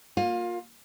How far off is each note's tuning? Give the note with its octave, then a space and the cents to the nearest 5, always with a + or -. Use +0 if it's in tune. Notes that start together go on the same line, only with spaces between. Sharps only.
A#3 +0 F4 +25